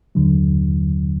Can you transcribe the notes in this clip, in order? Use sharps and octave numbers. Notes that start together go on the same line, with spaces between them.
D#2 D3 F#3